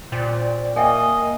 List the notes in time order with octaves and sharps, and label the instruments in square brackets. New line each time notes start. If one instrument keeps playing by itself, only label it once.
[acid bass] A#2 [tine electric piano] C5 D5 G5
[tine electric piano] A#3 [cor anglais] D#5 [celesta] E5 G5 G#5